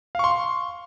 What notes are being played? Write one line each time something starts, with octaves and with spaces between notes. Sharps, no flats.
F5 C6 C#6